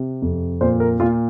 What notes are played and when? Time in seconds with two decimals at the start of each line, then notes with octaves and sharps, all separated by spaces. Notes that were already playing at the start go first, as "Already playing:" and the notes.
Already playing: C3
0.22 F2
0.61 A#2 C5
0.80 A#4
1.00 A#2 F4